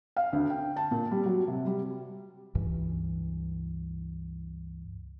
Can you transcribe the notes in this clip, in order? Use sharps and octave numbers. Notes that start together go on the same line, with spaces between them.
F5
D2
G5
A5
A#2
G3
F#3
C3
G3
C#2 G2 E3